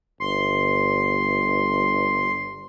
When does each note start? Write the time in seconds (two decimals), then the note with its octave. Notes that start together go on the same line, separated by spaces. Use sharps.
0.20 G1 C6